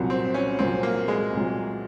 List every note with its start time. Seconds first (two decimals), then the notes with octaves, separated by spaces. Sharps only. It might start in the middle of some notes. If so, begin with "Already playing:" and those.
Already playing: C2 A#2 F#3
0.10 C4
0.34 C#4
0.59 C2 A#2 F#3 C4
0.83 A#3
1.08 G#3
1.33 C2 A#2 F#3